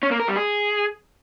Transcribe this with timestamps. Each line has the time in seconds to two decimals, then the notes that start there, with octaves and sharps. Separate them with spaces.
0.03 C#4
0.11 A#3
0.20 A#4
0.28 G3
0.37 G#4